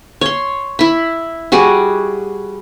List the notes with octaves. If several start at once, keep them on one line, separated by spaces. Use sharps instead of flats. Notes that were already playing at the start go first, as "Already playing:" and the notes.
C#5 C6
E4 B5
G3 F#4 G#4 D5